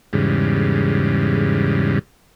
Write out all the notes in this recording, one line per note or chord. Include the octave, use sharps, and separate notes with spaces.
E2 G#2 C#3 G3